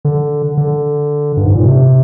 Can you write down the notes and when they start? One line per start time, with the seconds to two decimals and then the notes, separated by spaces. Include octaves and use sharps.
0.05 D3
0.57 D3
1.37 G2
1.45 G#2
1.55 A#2
1.65 C3